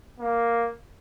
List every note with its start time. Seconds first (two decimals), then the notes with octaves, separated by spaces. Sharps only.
0.20 A#3